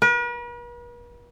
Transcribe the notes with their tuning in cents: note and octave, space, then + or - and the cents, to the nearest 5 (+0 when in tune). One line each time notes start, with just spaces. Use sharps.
B4 -45